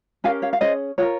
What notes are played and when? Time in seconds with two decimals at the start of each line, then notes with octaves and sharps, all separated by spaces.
0.24 C#4 G4 A#4 F5 G#5
0.42 C#5 F5
0.53 F5
0.61 C#4 G#4 C5 D#5
0.98 F4 A#4 C#5